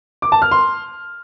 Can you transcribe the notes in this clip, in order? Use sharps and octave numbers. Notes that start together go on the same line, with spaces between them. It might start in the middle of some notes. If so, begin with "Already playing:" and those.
D6
A5
F6
C6